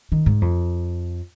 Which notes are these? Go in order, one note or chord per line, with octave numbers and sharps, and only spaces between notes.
D#3
G#2
F2